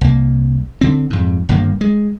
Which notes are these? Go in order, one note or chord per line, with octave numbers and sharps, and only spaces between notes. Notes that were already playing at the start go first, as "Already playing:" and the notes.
C2 A#3
D3 C4
F2 G#2
G1 G2 D#3 A#3
G#3